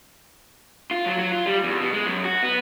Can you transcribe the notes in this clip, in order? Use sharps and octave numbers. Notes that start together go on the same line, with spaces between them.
F4
F#3
F#3
F4
G3
E2
B2
G#3
F#2
F#4
B3